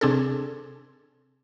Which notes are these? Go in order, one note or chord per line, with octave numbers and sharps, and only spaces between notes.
C3 C4 D4 G#4 A4